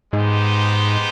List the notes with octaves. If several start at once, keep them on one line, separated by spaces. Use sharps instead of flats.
G#2 G#3 B3 D#4 G4 C5